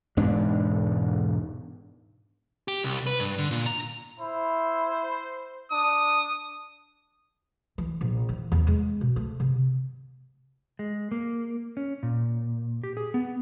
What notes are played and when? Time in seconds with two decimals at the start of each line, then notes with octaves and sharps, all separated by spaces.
0.17 E1 G#2 D4
2.68 G4
2.84 C2
3.07 B4
3.20 G2
3.38 D3
3.51 A#2
3.66 A#5
4.20 E4 C5
5.72 D4 D#6
7.78 E3
8.01 A#1
8.29 E3
8.52 E2
8.67 G#3
9.01 B2
9.16 A3
9.40 C3
10.79 G#3
11.11 A#3
11.77 C#4
12.03 A#2
12.83 G4
12.97 G#4
13.14 B3